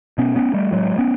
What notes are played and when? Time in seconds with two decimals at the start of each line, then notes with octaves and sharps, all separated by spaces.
0.18 B2 B3 C#4
0.36 B3 C#4
0.54 G3 A3
0.72 A2 F#3 G#3
0.98 B3 C#4